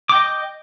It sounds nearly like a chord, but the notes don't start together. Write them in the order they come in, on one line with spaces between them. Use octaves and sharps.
D6 G5 D#5